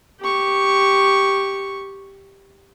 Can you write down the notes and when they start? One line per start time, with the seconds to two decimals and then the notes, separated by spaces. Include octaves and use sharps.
0.21 G4 C#6